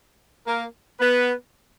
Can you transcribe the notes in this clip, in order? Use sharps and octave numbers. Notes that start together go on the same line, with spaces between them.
A#3 A#4
B3 B4